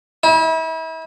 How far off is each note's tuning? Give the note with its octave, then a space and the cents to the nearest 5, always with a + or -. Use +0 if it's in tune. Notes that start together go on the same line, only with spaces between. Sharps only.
E4 -35